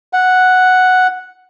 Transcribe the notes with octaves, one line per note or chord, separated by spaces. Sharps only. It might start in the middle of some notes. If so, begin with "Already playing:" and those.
F#5